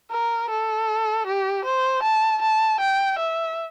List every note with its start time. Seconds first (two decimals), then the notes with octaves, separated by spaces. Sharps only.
0.11 A#4
0.50 A4
1.27 G4
1.65 C5
2.03 A5
2.42 A5
2.80 G5
3.19 E5